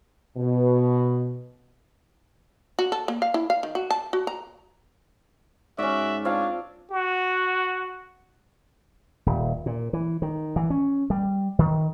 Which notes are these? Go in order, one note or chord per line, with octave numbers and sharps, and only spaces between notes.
B2
F#4
A4
A#3
F5
E4
F5
D#3
F#4
A5
F#4
A#5
G#2 C#4 F#4 D5 E5
C4 D4 F4 C#5 F5
F#4
D#1
A#2
E3
D#3
E3
C#4
G3
D#3